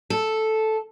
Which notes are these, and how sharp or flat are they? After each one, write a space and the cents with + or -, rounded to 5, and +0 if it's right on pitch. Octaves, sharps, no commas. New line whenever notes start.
A4 -5